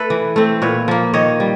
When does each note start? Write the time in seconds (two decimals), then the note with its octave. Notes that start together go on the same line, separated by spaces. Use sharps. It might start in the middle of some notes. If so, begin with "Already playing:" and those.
Already playing: A3 A4 B4
0.10 E3
0.36 A3 C4
0.62 A#2 B4 C#5
0.88 F3 A#3
1.13 D#3 C#5 D#5
1.40 G3